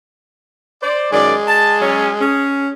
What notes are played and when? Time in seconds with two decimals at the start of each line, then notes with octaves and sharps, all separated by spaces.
0.83 C5 D5
1.12 F#2 D#3 G#3 D5
1.47 A5
1.81 F#3 C#4
2.21 C#4 G#4